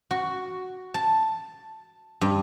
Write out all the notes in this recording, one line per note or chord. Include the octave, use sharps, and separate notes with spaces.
F#4
A5
G2